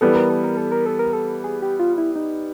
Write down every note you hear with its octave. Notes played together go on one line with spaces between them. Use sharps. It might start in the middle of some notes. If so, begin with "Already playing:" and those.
E3 G3 B3 A4
A#4
A4
A#4
A4
A#4
A4
A#4
A4
G#4
G4
F4
E4
D#4